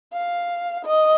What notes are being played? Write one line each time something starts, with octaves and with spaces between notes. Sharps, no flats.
F5
D#5